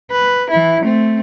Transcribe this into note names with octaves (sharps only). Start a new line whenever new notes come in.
B4
E3 E4
A3 C4